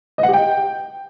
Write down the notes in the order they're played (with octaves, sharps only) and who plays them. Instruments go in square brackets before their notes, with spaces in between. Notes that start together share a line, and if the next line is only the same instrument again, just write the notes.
[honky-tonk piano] D#5
F#5
G4
G5